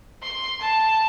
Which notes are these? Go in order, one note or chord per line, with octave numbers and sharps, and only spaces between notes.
C6
A5